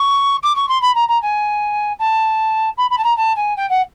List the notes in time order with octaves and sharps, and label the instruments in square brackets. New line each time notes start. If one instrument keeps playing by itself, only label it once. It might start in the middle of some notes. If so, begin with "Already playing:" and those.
Already playing: [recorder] C#6
D6
C#6
C6
B5
A#5
A#5
G#5
A5
B5
B5
A5
A#5
A5
G#5
G5
F#5